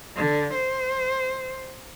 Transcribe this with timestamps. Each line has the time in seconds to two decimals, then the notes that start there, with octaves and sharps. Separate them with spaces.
0.17 D3
0.54 C5